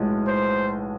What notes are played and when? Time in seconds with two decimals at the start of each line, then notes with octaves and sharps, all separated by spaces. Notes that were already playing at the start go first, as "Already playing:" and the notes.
Already playing: B1 A2 F3 G#3
0.27 C5